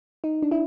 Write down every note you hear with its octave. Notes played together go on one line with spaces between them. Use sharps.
D#4
D4
E4